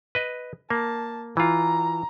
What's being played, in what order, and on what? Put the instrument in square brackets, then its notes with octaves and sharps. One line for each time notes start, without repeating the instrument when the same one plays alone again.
[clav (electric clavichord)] B4 D#5
[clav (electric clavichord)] A#3 [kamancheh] A5
[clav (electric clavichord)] E3 F4 [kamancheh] A#5